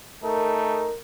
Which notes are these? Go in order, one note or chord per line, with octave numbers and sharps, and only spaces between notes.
A3 D#4 A#4